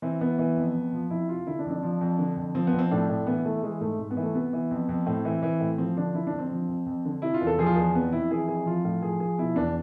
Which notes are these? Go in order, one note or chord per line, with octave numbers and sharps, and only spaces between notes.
E3 C4
E3 B3
E3
F2
F2
F3
F2 E4
C3 F4
D3 E4
D4
F2
D4
F3
F2
D3
F2
F3 C4
B3
F2
C4
A2 D4
A2
E3 B3
E3 A3
E3 G#3
G#2 A3
G#2
B3
E3
A3
C3 B3
E3
F2
F2
A2 C4
E3
E3
A2
F3 C4
D3 D4
D3 E4
D4
F2
C4
F3
F2
F2
D3
C3 E4
F4
E2
A4
F3 G#4
F4
E2 G#4
F2 B3
F2 E4
E3 G#4
F2 G#4
F3 F4
A2 F4
F3 G#4
F3 G#4
B2 E4
E2 D4